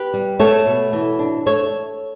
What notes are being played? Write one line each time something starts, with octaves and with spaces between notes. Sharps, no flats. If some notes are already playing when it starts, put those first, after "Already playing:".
Already playing: G4 B4
G3
A3 A4 C#5
B2
E3
D4
A3 A4 C#5